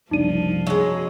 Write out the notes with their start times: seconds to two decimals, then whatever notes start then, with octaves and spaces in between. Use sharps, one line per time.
0.11 F#1 C2 F3 D4 D#4 D#7
0.67 F#3 G#3